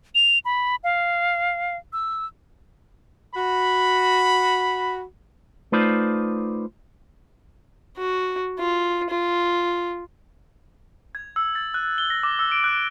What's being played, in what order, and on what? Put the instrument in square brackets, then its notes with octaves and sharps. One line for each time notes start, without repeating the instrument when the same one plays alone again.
[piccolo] F7
B5
F5
E6
[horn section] F#4 B5
[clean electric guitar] A3 D#4 F4 B4 C5 D5
[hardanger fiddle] F#4
F4
F4
[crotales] G#6
E6
A6
F#6
G7
A#6
D6
E6
D7
F#6